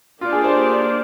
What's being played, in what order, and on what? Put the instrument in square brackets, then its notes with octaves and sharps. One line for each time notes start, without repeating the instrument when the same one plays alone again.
[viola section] A#3 D4 G4 D5 [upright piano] F4
[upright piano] G#4
C5